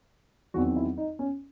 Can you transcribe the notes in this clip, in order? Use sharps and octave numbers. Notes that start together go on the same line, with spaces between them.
E2 D#3 F#3 C4 F#4
E4
D#4
C#4